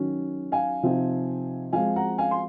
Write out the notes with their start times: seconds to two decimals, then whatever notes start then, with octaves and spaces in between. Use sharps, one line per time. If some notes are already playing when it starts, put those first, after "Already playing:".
Already playing: D#3 F#3 C#4
0.52 F5 G#5
0.83 C3 F3 C4 D#4
1.73 F3 G#3 C4 F5 G#5
1.96 F#5 A#5
2.18 F5 G#5
2.31 C6